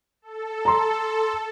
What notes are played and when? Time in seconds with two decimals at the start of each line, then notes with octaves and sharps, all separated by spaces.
0.22 A4
0.65 A#5 C6